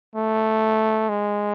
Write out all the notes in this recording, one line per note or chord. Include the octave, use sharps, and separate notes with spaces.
A3
G#3